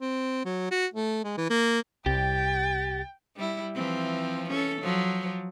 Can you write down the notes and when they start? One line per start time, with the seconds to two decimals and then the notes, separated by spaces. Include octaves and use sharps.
0.01 C4
0.45 F#3
0.71 F#4
0.93 A3
1.24 G#3
1.37 E3
1.50 A#3
2.06 C2 G4 G5 A6
3.37 G3 E4
3.75 E3 F3 C4
4.49 C#4 A4
4.82 F3 F#3